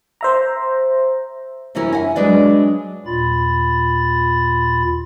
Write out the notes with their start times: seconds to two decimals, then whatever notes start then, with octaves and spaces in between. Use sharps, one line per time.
0.21 C5 E5 A#5
1.75 C3 E3 C#4 E4 A#4
1.93 E5 F#5 G#5
2.15 F#3 G#3 D4 B4 D5
3.06 D#2 A#2 F4 B5 A6